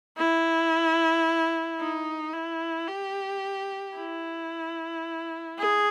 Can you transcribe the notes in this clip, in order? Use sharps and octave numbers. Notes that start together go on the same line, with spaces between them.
E4
D#4
E4
G4
E4
G#4